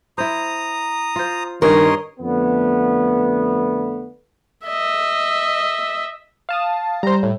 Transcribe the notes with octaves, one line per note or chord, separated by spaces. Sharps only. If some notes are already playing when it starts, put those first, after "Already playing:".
E4 C5 A#5 D#6
F4 C5
G2 D#3 C#4 A#4 C#5 D#5 C6
F2 D3 A3 B3
D#5 E5
F5 A5 D#6
G3 C5 A#5
A2